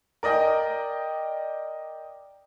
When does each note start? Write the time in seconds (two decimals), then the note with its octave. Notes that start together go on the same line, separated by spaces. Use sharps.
0.23 A#4 D5 D#5 G5